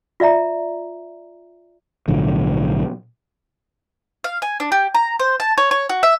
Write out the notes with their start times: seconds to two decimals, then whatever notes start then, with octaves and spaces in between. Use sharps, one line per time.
0.20 F4 D5 E5 A#5
2.08 B1 A2 D3 F3
4.24 F5
4.42 G#5
4.60 D4
4.72 G4
4.94 A#5
5.19 C5
5.40 A5
5.58 C#5
5.71 C#5
5.89 F#4
6.03 E5